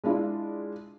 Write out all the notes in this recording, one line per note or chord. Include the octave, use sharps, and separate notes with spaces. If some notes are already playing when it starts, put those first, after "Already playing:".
G#3 D4 E4 F4